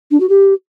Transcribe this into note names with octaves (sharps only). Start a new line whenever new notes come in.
D4
F#4
G4